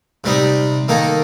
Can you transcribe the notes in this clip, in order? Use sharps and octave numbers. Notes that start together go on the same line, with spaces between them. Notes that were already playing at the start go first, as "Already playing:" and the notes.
C3 G3 C4 D#4
D#3 A#3 D#4 A4